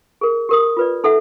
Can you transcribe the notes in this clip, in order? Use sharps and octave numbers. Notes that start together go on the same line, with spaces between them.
G#4 A#4
G4 A#4 D#6
F4 B4 D5
D#4 A4 E5 F#5